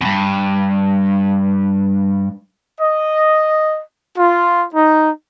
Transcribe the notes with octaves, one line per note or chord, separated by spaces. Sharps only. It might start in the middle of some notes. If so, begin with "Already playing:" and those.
E2 G2
D#5
F4
D#4